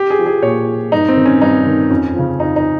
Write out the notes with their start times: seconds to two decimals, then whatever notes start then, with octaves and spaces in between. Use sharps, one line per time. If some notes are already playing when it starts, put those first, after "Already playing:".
Already playing: G4
0.10 G#4
0.19 F3
0.26 G#4
0.42 A#2 C#5
0.67 F3
0.92 G2 D#4
1.08 C4
1.17 D#3
1.26 C#4
1.41 G2 D#4
1.66 D#3
1.90 F2 C#4
2.15 C#3 F3
2.39 F2 D#4
2.56 D#4